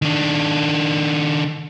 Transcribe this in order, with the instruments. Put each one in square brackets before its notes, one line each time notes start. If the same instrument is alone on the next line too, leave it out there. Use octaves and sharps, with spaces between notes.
[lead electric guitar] D#3 D4